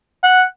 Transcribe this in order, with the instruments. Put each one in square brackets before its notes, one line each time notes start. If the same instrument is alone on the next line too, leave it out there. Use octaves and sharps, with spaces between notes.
[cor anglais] F#5